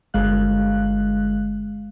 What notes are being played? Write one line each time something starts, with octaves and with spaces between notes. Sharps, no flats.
G1 G#3 F5 F#6